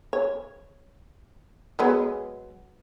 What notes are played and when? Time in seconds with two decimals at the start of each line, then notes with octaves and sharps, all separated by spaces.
0.13 C#5
1.79 F#3 G#3 B3